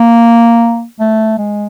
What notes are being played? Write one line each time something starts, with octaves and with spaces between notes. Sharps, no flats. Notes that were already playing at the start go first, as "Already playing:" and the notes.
Already playing: A#3
A3
G#3